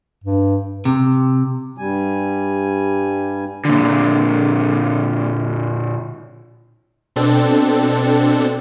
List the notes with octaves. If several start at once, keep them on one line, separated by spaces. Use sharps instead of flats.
G2
C3
G2 G3 G#5
A#2 D3
B2 C4 D4 A4